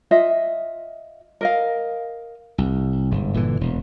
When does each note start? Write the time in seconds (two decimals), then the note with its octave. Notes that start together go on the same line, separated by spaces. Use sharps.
0.11 F4 D#5 E5
1.41 A#4 D#5 F5
2.58 C2
3.11 G1 G#2
3.34 G1 A#2 D3 E3
3.61 E1